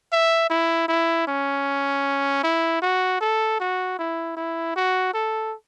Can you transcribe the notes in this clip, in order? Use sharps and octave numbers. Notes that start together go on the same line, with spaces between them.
E5
E4
E4
C#4
E4
F#4
A4
F#4
E4
E4
F#4
A4